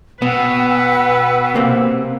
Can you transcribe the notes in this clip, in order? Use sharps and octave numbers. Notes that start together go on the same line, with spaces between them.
B2 B3 B4 F#5 G5 E6
C3 A#3 C4